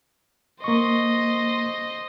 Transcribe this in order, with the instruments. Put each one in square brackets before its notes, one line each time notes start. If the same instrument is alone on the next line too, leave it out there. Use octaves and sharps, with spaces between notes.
[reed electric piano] A#3 C#6 [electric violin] C5 D#5